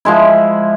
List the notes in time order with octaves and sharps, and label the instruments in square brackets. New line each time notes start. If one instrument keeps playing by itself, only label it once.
[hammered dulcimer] F3 G#3 E4